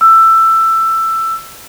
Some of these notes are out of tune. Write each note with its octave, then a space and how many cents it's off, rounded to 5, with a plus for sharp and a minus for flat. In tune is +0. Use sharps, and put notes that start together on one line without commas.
E6 +15